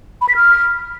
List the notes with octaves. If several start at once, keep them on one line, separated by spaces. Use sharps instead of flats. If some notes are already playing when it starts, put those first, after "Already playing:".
B5
B6
F6